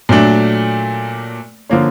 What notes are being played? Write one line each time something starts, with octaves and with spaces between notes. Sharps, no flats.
A#2 F#3 A3 D4
D3 F3 A#3 C#4